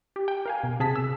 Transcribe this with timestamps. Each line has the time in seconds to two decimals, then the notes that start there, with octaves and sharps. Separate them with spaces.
0.16 G4
0.28 G5
0.46 A#4 F5 G#5
0.63 B2
0.80 C3 G#4 A5 B6
0.96 E6